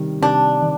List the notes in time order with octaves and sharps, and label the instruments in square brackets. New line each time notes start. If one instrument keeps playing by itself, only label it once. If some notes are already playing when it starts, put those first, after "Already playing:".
Already playing: [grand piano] C3 D#3 G3
[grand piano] C3 [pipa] D4
[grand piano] D#3